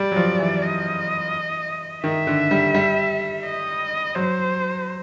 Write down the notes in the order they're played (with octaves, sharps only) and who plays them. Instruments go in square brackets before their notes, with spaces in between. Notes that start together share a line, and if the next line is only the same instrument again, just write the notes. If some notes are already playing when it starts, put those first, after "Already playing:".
Already playing: [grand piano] G3 [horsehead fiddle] D5
[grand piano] F#3
F3
E3
[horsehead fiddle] D#5
[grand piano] D#3 [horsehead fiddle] E5
[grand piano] D3
G3
G3
[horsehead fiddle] D#5
[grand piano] F#3 [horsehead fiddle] C5